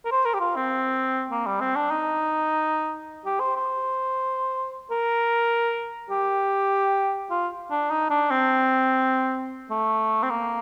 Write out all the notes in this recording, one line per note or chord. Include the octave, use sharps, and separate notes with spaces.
A#4
C5
A#4
G4
F4
C4
A#3
G3
C4
D4
D#4
G4
C5
C5
A#4
G4
F4
D4
D#4
D4
C4
A3
C4
A#3